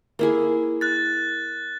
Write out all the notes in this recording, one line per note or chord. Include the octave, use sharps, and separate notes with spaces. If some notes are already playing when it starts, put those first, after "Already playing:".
A#3 E4 G#4
F#6 A6